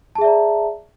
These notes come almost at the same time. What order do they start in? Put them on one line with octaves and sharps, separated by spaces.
A5 G#4 E5 D5 A#5